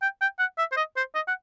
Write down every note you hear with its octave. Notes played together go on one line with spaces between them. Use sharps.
G5
G5
F#5
E5
C5
D#5
C5
D#5
F#5